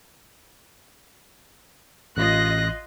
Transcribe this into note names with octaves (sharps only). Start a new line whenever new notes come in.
A1 F4 D#5 F#6 A#6